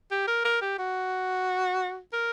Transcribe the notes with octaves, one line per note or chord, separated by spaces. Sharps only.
G4
A#4
A#4
G4
F#4
A#4